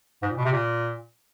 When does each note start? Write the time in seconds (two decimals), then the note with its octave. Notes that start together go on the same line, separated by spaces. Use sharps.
0.22 G#2
0.30 A#2
0.37 B2
0.45 C3
0.52 A#2